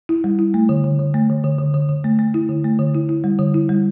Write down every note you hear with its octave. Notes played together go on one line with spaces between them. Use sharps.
E4
G3
E4
A3
D3
D3
D3
A3
D3
D3
D3
D3
D3
A3
A3
E4
D3
A3
D3
E4
E4
G3
D3
E4
G3